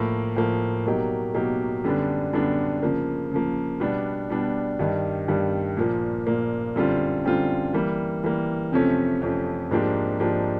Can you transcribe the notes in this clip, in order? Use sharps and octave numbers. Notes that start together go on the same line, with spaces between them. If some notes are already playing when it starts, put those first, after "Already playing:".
Already playing: A2 F3 A#3
A2 F3 A#3
B2 F#3 A#3 D#4 G4
B2 F#3 A#3 D#4 G4
F#2 D3 G3 B3 D4
F#2 D3 G3 B3 D4
C#3 F3 A#3
C#3 F3 A#3
B2 G3 B3 D4
B2 G3 B3 D4
G2 D#3 G3
G2 D#3 G3
A#2 F3 A#3
A#2 F3 A#3
F#2 D3 G3 C4 F4
F#2 D3 G3 C4 F4
E3 G3 A#3
E3 G3 A#3
F2 C3 F3 A3 C#4
F2 C3 F3 A3 C#4
G#2 F3 A#3 D4 G4
G#2 F3 A#3 D4 G4